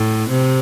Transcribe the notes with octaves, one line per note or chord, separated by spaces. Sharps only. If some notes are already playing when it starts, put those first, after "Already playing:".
Already playing: A2
C3